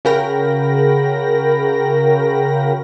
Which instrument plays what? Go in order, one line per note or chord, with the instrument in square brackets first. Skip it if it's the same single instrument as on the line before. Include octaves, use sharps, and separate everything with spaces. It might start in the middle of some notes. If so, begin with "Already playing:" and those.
[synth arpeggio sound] C#3 F#4 A#4 G5 B5 A#6